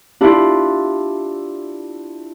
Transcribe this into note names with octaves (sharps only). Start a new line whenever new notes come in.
D4 E4 F4 G4